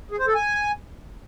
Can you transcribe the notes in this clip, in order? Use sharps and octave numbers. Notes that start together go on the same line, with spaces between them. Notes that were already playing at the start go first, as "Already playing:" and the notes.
G#4
C5
A4
G#5